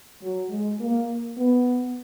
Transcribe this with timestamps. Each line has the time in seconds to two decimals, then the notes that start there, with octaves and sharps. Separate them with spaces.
0.21 F#3
0.50 G#3
0.80 A#3
1.38 B3